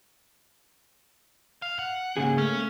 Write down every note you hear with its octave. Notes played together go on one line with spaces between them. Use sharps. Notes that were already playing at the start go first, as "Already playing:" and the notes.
F5
F#5
G#2 C#3 A#3 G#4
A3 C#4